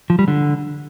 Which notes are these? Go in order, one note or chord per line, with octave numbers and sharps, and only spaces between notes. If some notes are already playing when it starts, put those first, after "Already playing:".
F3
G3
D3